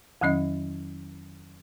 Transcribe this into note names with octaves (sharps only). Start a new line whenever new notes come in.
F2 D#3 F#3 C#4 D#5